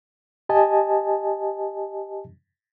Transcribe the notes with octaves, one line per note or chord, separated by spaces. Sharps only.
G4 D#5 G#5 A5